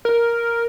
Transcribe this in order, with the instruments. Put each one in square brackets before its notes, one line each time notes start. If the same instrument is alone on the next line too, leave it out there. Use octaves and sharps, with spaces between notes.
[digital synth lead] A#4